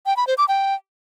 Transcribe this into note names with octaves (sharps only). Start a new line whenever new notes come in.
G5
B5
C5
D6
G5